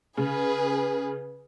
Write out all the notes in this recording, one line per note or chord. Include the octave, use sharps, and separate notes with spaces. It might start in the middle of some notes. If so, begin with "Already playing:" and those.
C#3 G#4 B4